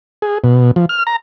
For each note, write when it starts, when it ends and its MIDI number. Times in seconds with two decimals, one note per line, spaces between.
0.22 0.38 68
0.44 0.71 47
0.76 0.86 53
0.89 1.03 89
1.07 1.16 82